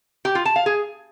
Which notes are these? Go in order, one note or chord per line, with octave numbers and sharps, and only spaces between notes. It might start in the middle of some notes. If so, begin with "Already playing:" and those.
G4
F4
A5
F5
G#4